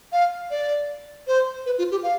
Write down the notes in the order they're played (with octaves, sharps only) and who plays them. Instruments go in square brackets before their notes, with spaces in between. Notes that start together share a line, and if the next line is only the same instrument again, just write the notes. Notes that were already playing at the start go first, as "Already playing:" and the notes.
[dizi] F5
D5
C5
B4
F4
G4
F5